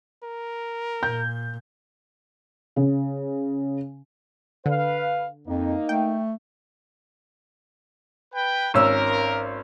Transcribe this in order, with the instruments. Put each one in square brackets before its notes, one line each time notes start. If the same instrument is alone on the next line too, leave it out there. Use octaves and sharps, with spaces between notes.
[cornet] A#4
[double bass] A#2 [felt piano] G6
[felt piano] C#3
[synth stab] D3 [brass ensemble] B4 F5
[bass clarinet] F2 [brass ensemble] A#3 D#4
[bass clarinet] A3 [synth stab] G5
[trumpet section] B4 G5
[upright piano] G#1 C#4 E6 [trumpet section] A#4